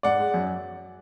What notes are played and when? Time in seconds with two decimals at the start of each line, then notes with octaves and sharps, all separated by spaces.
0.03 G#2 D5 F#5
0.19 G#3
0.34 F#2